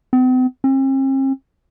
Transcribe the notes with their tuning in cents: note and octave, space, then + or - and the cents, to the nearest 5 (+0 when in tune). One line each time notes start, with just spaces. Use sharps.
C4 -45
C4 +45